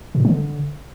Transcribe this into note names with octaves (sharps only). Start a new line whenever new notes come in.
A#2
A2
F#3
D3